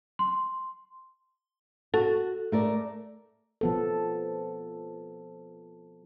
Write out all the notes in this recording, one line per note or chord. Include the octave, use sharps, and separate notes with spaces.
C6
F#4 A4
A3 A#4 D5
F3 B3 A4